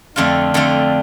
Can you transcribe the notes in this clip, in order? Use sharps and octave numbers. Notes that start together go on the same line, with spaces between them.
F2 D3 A3 D4 F4
F2 D3 A3 F4